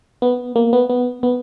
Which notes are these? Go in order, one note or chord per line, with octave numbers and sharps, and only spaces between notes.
B3
A#3
B3
B3
B3